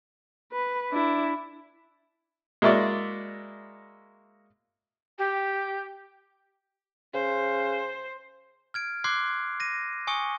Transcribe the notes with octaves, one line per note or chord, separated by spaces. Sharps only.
B4
D4 E4
G#3 A#3 E4 F#4 D5 E5
G4
C#3 C5
F6 G#6 D7
C6 D6 F#6 G#6 C7
A#6 D#7
G#5 C#6 D#6 C#7 G7